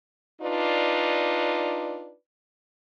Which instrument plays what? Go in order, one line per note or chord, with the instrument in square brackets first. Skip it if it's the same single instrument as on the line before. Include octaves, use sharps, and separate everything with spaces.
[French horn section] D4 D#4 F4 B4 D5